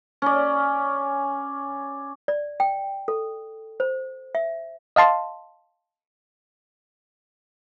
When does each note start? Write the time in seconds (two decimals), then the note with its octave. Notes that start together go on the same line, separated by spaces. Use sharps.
0.22 C#4 D5
2.28 D5
2.60 G5
3.08 A4
3.80 C5
4.35 E5
4.96 D#5 F5 A5 C6